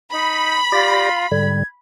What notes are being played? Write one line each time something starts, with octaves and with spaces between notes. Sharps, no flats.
D#4 B5
F4 G4 D5 A#6
G#2 D3 G3 G#6